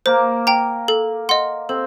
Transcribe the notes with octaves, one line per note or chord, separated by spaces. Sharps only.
A#3 C5
G5 A#5
A4
D#5 F#5 C6
C4 A4